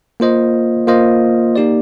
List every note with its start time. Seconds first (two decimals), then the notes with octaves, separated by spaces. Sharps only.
0.20 A#3 F4 C5 D#5
0.87 A#3 F4 C5 D#5
1.56 A#3 D#4 G4 D5